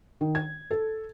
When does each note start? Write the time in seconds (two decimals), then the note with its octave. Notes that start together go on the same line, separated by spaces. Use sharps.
0.21 D#3
0.35 G#6
0.71 A4